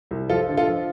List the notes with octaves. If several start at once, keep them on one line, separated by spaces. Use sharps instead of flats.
C2
F3 F4 A4
D3
F4 A4
F3